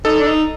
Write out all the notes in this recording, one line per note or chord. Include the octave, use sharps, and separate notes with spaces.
D#4 A4
D4
D#4